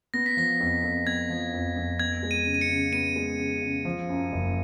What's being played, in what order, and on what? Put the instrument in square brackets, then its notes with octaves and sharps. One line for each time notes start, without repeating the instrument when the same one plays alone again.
[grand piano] B3 [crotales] A#6
[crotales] B6
[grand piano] F3 [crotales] A#6
[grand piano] F2
F2
[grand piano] B3 [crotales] G#6
[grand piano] F3
F2
F2
[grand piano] B3 [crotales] G#6
[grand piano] G#3
[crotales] D#7
[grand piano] C#3
[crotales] D#7
C#7
[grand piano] C#3
[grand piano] B3 [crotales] D#7
[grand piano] G#3
C#3
C#3
F3
F#2
F#1